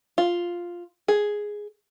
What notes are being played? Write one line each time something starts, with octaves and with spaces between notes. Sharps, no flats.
F4
G#4